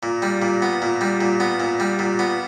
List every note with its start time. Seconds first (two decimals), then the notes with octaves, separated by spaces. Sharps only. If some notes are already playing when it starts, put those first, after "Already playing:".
0.03 A#2
0.22 G3
0.42 A#2
0.62 B3
0.82 A#2
1.01 G3
1.21 A#2
1.40 B3
1.60 A#2
1.80 G3
1.99 A#2
2.19 B3